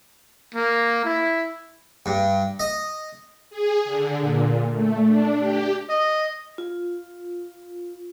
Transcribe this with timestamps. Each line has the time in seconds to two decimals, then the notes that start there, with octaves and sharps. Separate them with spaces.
0.54 A#3
1.05 E4
2.06 G2
2.60 D#5
3.50 G#4
3.85 D3
4.20 A#2
4.73 A3
5.07 D4
5.39 G4
5.90 D#5
6.58 F4